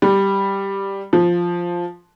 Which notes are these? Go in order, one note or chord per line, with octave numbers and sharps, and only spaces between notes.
G3
F3